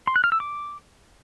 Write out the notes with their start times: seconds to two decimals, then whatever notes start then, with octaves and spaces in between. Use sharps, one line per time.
0.07 C6
0.16 F#6
0.24 F6
0.32 E6
0.40 D6